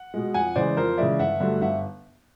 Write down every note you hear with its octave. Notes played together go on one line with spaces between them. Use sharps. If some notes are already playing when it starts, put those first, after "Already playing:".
Already playing: F#5
B2 G#3
F2 F#5 G#5
C#3 E3 G#3 C5 D5
F2 A#4 C5
C#3 E3 G#3 D5 E5
G1 E5 F#5
G2 D3 F#3 A3
G1 E5 F#5